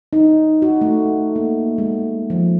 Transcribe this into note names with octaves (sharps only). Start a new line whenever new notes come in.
D#4
F#4
A3
A#3
G#3
F3